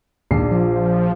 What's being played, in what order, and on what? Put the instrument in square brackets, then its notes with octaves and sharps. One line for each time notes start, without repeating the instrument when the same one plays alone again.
[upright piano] A#1 D4 C7 [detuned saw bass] D#2
[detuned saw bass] F3